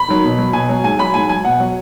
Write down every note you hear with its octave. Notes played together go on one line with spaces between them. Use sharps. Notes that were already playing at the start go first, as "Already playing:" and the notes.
Already playing: B5
D#3 F#3
B2
F#3
B2 G#5
F#3
G#2 G#5
F#3 B5
G#2 G#5
F#3 G#5
B2 F#5
F#3